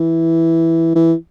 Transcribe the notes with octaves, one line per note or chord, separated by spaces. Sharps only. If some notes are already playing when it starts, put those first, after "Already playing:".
Already playing: E3
E3